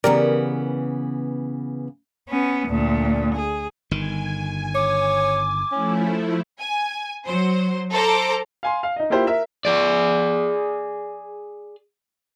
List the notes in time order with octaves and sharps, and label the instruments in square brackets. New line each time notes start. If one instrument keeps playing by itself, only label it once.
[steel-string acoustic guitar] C#3 E3 B3 [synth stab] G4 A#4 D5
[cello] B3 C#4
D2 A#2
G#4
[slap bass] G1 D#3 [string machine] G#5
[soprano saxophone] C#5 [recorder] D6
[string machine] F3 A3 E4 [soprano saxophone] C#4
[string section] G#5
F#3 C5
A4 C5 A#5 D6
[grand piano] F5 G#5 C6
F5
D#4 D#5
A#3 E4 F4 G4 C5
A#4 E5
[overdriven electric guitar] G#4 D5